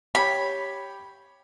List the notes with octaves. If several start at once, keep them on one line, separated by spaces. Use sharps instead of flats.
G4 C#5 B5